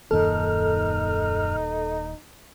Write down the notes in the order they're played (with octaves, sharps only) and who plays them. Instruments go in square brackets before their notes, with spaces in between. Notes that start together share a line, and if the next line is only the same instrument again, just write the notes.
[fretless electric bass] D#1 A#2 D#3 [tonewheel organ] F#2 F6 [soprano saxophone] D#4 [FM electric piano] A4